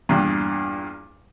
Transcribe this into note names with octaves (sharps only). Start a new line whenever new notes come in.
E2 G2 A#2